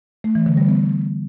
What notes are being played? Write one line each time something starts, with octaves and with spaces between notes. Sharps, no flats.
A3
E3
D3
G3
B3